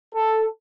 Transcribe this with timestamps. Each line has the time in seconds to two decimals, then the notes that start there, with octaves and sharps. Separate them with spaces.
0.14 A4